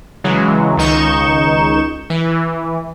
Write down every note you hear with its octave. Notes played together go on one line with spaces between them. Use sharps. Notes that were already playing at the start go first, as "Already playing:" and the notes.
C#3 E3 F#3 G#3
C#2 D#3 D#4 C#6 G6 E7
E3